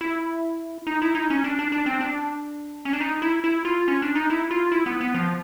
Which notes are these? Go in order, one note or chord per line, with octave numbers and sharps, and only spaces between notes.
E4
D#4
E4
D#4
C#4
D4
D4
D4
C4
D4
C#4
D4
D#4
E4
E4
F4
C#4
D4
D#4
E4
F4
E4
B3
B3
F3